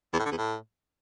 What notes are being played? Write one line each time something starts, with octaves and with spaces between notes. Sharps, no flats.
E2
A2
D3
E2
A2